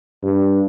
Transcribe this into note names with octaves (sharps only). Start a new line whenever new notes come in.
G2